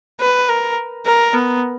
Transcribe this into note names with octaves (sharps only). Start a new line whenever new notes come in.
B4
A#4
A#4
B3